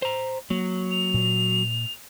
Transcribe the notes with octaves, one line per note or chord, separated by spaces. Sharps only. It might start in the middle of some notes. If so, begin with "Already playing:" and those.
C5 A#5
F#3 A#3
F7
A#2